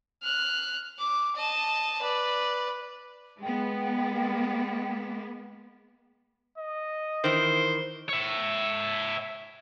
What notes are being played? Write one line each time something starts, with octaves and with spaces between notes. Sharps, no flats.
F6 F#6
D6
D#5 A5
B4 D5
G#3 B3 G5
D#5
D#3 E3 C5
C#5 E5